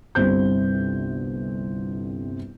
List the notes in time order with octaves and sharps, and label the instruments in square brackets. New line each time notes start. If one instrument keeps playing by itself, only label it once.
[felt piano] G1 C2 C3 C5 G6